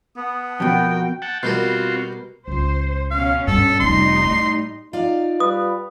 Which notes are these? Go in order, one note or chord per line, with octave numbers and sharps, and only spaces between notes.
B3 A5 D#6
F2 B2 F#4 A#4 F#5 G5
F#5 G5 A5
B2 G3 C4 F4 F#4 A#4
C#2 F4 C5
B2 C#4 F5
G2 A4
F1 D#3 G3 D#4 C6
A2 A3
D#4 F4 D5 F5
G3 B4 D#6